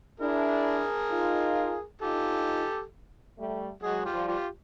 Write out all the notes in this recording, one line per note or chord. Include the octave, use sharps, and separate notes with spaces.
D4 E4 G#4 A#4
D#4 F4
D#4 F4 G4 A4
G3 A3
F#3 G#3 F#4 G#4
F4 G4
F3 G3
F4 G4